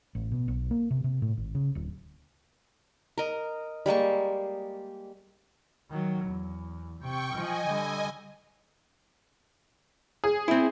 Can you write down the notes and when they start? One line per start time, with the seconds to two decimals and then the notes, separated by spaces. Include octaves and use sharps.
0.15 A1
0.31 B2
0.48 B1
0.71 A#3
0.91 C3
1.04 C3
1.22 A2
1.37 G#1
1.55 C#3
1.75 D1
3.18 A#4 D#5
3.86 G3 G#3 A#3 C#6
5.91 D#3 F#3
6.25 E2
7.00 C3 G5 C#6
7.34 F3 D#5 G#5
7.67 D3 G3
10.24 G#4
10.48 C4 E4